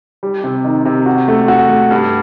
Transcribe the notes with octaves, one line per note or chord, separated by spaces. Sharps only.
G3
C3
D#3
C3
F#4
A3
F#4
A3
G2